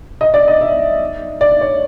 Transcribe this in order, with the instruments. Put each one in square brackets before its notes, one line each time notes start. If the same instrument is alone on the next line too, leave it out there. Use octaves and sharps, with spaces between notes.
[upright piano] D#5
D5
D#5
E5
D5
C#5